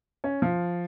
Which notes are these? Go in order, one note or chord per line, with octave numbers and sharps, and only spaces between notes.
C#4
F3